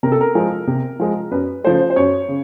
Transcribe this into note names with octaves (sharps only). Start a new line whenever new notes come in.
C3 A#4
A4
A#4
F3 G#3
C3
F3 G#3
F#2 B4
C#3 F3 A3 C5
C5
F#2 C#5
C#3